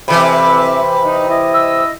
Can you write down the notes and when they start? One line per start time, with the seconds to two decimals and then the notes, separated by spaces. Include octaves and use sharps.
0.08 F2 C3 E3 C4 E5 B5
1.03 D#4
1.28 E4 D#5
1.54 E6